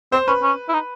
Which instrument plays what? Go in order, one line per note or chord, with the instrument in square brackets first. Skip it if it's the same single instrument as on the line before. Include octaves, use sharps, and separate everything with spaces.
[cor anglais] C4 [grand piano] C5
[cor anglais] C#4 [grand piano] B4
[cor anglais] C#4
E4
D#4